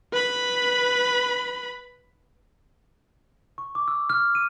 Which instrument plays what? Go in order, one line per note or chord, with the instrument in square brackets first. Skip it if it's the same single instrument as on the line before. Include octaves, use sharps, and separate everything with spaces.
[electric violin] B4 B5
[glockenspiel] C#6
D6
E6
F6
D#7